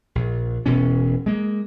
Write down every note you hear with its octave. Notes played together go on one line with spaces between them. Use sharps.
A#1
E1 B2 E3 C#4
G#3 A#3